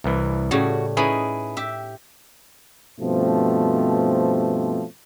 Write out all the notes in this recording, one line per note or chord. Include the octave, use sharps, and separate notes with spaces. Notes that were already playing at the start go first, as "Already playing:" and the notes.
C2 E3
A2 C#3 G3 F#4
C#4 D#4 E4 G#4 B4 B5
G4 E5
G2 B2 F3 A3 C4